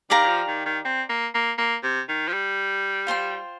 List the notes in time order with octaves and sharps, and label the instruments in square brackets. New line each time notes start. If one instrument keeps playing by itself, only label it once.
[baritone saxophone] D#3 [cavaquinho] G4 D5 F5 A#5
[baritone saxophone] D#3
F3
D#3
D#3
C4
A#3
A#3
A#3
C3
D#3
F3
G3
[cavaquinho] F4 C5 G5 C6